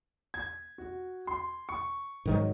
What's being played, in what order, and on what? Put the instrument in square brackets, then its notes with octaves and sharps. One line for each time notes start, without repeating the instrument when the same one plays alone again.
[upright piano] G#6
F#4
C6
C#6
[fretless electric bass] G#2 D#3 F#3